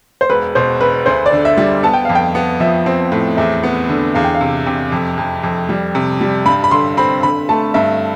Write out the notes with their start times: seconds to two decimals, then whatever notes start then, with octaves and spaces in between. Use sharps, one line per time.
0.21 C5
0.29 E1 B4
0.55 B2 C5
0.81 E1 B4
1.06 D2 C5
1.26 D5
1.32 D3
1.45 E5
1.57 G3
1.83 B3 A5
1.94 G5
2.05 F2 F5
2.15 G5
2.35 B3
2.60 F3 E5
2.86 C4
3.12 A2
3.37 E2 E5
3.63 B3
3.89 D3
4.15 E2 F5
4.24 G5
4.35 F5
4.41 C3
4.66 C3
4.92 F2
5.18 F2
5.44 F2
5.69 G3
5.95 C3
6.21 G3
6.46 G2 B5
6.64 B5
6.71 D3 C6
6.97 C4 B5
7.23 D3 B5
7.49 A3 A5
7.74 G2 E5